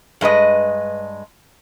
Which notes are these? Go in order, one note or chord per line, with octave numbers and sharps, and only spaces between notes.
G2 G#3 B4 D#5